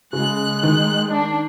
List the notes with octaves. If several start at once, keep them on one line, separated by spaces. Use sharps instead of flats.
C#3 G#3 F#6
D#3
D4